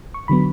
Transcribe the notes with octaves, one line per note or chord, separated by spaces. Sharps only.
C#6
D3 F#3 B3 B5